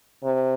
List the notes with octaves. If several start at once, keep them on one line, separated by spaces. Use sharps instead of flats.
C3